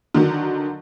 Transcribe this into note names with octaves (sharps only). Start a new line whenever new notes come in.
D3 D#3 F#3